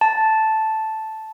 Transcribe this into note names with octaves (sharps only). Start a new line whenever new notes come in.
A5